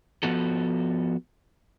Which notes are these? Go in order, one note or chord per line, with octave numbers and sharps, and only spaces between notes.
F3 B3 F#4 A4